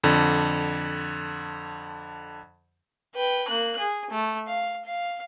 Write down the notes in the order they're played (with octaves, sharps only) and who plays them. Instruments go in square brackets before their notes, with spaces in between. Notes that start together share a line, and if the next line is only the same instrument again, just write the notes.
[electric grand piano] F2 D3
[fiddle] B4 G5
A#3 F#6
G#4
A3
F5
F5